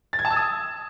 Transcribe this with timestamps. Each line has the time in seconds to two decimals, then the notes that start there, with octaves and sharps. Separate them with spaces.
0.13 A6
0.19 G#6
0.25 A5
0.30 E6
0.36 D#6